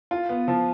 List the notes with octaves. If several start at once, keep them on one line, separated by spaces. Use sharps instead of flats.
F4
B3
F3